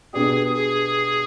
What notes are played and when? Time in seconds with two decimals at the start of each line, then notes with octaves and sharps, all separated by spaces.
0.13 B2 B3 D4 G4 G#4
0.53 G#4